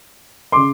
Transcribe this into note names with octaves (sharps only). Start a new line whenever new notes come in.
C#3 C6 D6